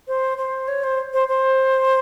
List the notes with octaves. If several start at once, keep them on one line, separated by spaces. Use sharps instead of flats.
C5
C5
C#5
C5
C5
C5